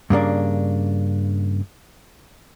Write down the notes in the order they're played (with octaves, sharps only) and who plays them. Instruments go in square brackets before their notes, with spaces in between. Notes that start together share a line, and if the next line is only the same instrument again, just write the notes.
[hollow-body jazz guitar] G2 C#3 A#3 D4